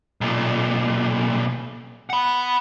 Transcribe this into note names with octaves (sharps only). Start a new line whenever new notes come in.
B1 A#2
F#5 B5